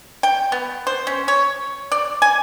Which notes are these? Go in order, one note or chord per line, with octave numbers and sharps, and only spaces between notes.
G5
B3
C5
C#4
C#5
D5
G#5